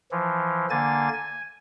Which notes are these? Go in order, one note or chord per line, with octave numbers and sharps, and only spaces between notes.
E3 F3
D3 A#3 G#5 A6
G#5